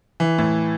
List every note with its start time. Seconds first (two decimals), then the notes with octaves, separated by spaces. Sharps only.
0.20 E3
0.38 A2